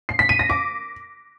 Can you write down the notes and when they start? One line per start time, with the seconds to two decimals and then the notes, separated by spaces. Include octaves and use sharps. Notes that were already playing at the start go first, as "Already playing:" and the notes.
0.09 C7
0.19 B6
0.29 D#7
0.39 A#6
0.50 D6